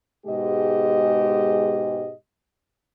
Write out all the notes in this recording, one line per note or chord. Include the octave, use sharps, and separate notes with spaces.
G#2 B2 G#3 G4 D#5